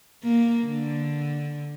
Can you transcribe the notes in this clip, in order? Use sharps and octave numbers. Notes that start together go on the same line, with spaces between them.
A#3
D3